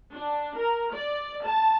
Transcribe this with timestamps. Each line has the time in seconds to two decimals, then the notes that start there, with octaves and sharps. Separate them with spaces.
0.13 D4
0.57 A#4
0.93 D5
1.44 A5